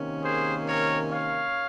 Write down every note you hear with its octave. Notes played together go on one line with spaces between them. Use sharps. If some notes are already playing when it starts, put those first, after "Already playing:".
Already playing: C3 D#3 A#3 C#4
G#4 C5
A#4 C#5
C#5 F5